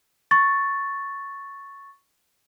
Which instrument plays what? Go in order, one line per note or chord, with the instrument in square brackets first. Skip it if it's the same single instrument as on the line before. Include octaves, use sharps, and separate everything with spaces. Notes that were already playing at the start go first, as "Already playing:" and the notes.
[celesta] C#6 A6